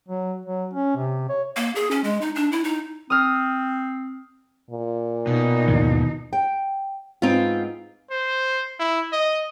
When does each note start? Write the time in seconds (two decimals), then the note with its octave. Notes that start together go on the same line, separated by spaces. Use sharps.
0.08 F#3
0.46 F#3
0.73 C#4
0.96 C3
1.29 C#5
1.56 A#3
1.75 G#4
1.91 C#4
2.04 G#3
2.21 D#4
2.36 D4
2.52 E4
2.64 D#4
3.10 C4 D#6 F6
4.71 A#2
5.27 B2 D#4
5.68 D#2 G#2 F3
6.33 G5
7.22 G#2 B3 C4 D#4 F4
8.11 C5
8.79 E4
9.13 D#5